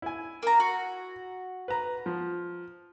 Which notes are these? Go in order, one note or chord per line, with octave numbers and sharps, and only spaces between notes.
E4 G#5
A#3 A#5
F#4
B4 A#5
F3